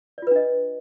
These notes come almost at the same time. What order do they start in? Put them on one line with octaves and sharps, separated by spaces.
D5 F4 B4 D4 D#5